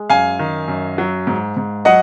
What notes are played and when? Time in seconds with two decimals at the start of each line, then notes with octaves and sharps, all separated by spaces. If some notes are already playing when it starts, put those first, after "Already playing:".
Already playing: G#3
0.10 F#2 F5 G#5
0.39 D#3
0.68 F#2
0.98 F#3
1.27 G#2
1.57 G#2
1.85 F#3 D#5 F#5